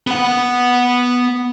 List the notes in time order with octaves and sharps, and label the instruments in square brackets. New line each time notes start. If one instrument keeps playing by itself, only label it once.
[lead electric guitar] B3 F#5